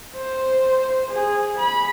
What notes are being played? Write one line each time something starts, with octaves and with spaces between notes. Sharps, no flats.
C5
G#4
B5